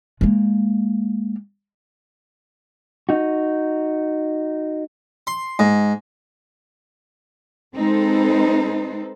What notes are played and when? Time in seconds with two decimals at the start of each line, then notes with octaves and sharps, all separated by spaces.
0.21 G#3 A#3
3.09 D#4 F#4
5.27 C6
5.59 G#2
7.74 G#3 C4 D#4 A4 B4 C5